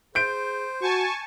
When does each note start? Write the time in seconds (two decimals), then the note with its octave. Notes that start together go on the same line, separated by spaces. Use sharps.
0.15 G#4 C5 G6 D7
0.81 F#4 G#5 A5 C#6